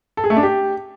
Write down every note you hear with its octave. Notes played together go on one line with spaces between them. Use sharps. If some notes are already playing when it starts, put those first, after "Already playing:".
A4
G#4
A3
D4
G4